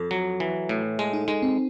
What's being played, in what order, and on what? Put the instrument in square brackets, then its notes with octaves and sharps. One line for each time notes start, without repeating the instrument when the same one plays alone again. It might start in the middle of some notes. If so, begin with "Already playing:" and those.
Already playing: [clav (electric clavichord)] F2 [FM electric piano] A4
[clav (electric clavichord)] F#3
E3
A2
[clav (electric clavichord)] G#3 [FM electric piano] A4
[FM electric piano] D#4
[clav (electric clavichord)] G#3 [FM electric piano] D#4
[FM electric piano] C4